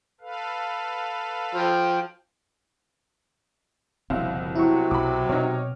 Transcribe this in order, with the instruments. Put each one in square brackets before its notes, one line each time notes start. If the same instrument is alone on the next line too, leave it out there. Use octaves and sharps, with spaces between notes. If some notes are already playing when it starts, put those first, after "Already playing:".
[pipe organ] A4 B4 F5
[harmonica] F3 G5
[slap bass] F#1 F3 C4 [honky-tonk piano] C2 B2 [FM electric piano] E5 F5
[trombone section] C3 F#3 [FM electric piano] E4 C#6
[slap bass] B1 [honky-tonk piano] B5 D6
[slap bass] B2 C4 [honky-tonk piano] D#4 C#5 [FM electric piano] D6 F6